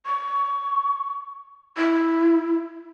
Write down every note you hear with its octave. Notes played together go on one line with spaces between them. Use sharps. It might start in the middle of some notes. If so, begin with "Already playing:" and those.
C#6
E4